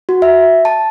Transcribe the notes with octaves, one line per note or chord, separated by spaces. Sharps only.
F#4
E5
A5